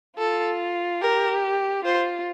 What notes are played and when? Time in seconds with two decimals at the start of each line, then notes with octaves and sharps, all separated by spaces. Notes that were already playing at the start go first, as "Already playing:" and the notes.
0.18 F4 A4
1.01 G4 A#4
1.84 F4 C5